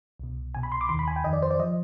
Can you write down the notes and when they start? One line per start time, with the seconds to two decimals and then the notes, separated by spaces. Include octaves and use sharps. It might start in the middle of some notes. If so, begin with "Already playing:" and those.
0.19 C2 B2
0.54 C2 B2 G#5
0.63 B5
0.72 C6
0.81 D6
0.89 D#2 D#3 C6
0.99 B5
1.08 G#5
1.16 G5
1.24 F2 D#3 D#5
1.33 D5
1.42 C5
1.51 D5
1.59 F3 D#5